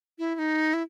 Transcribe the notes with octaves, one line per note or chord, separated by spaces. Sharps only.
E4
E4
D#4
E4